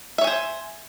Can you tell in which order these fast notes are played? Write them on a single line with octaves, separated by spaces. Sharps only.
E5 C#5 G#5 C5